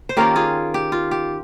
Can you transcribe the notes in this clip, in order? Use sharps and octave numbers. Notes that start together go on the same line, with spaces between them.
C5
D#3 A#3 C#4 F4 G4 A#4
F4 G#4
G4
F4
G4